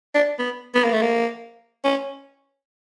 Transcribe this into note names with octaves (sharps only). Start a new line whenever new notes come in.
D4
B3
B3
A#3
A3
A#3
C#4